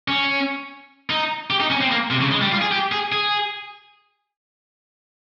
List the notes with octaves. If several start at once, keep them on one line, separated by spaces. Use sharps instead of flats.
C#4
D#4
G4
D#4
C#4
C4
A#3
C3
C#3
G#3
G3
F4
G#4
G4
G#4
G#4